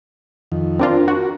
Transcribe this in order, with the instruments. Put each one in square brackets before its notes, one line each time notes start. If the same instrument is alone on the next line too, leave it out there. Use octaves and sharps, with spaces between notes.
[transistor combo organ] F2 D#3
[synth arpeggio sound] C4 D4 F4 [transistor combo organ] A#4
[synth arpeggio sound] F#4